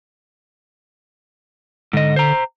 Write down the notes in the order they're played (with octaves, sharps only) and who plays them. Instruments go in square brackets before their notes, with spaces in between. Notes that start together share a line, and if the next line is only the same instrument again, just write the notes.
[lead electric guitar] G#2 D#5 [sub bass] D3
[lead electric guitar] C5 A#5